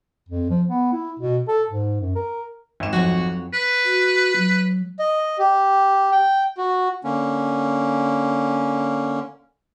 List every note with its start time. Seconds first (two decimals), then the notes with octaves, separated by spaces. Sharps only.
0.29 F2
0.50 F3
0.68 B3
0.93 E4
1.19 B2
1.48 A4
1.71 G#2
2.01 F#2
2.16 A#4
2.80 G#1 E7
2.93 F2 F3 F#3 F#4 C#5
3.53 B4
3.85 F#4
4.37 F#3
4.99 D#5
5.39 G4
6.12 G5
6.58 F#4
7.04 D3 A#3 C#4